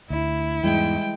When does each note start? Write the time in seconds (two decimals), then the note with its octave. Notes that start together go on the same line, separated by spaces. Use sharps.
0.10 D2 E4
0.63 E2 G#2 E3 G3 G#3 G5